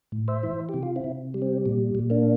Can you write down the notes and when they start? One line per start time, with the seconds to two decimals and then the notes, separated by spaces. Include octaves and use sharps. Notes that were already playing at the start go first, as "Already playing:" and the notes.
0.12 A2
0.28 C5 E5
0.43 E3
0.69 G4
0.74 C3
0.83 F4
0.96 C4 E4
1.04 C3
1.34 G3
1.42 C4
1.66 A#2
1.95 A#2
2.10 A#3 D4